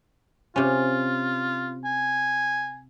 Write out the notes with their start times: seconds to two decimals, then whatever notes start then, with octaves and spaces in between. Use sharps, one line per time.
0.56 C3 C#4 F4
1.85 G#5